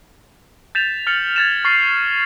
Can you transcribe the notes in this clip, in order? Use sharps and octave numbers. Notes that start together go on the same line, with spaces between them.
G6 A6 B6 E7 F7
F6 A6 C#7 F7 F#7
G#6 A6 E7
C#6 F6 A6 C7